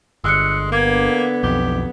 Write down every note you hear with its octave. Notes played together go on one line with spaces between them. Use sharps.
G1 G#3 E6 F#6 C#7
D3 A#3 B3 D6 G#6
B1 F2 G4